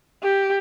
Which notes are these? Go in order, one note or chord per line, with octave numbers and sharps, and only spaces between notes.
G4